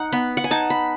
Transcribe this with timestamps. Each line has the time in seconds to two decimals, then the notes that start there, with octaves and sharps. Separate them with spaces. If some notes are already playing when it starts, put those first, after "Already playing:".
Already playing: D#4 F#5
0.12 B3 B5
0.37 F#5
0.44 G#5
0.51 D#4 A5
0.70 B5